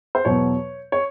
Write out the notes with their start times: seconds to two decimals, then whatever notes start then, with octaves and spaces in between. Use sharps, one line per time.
0.15 C5
0.25 E2 B2 F#3 C#5
0.92 C#5